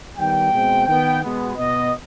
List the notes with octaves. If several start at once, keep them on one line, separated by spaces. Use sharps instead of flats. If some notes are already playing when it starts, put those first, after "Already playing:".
D#3 G3 B3 G5
B2 G#3 C4
D#3 B3 G5
B2 G#3 B3
B2 B3 D#5